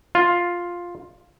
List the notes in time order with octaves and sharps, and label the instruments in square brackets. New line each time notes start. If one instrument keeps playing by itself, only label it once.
[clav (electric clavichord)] F4